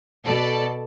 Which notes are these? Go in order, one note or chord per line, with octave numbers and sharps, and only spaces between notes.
B2 A4 D5 A5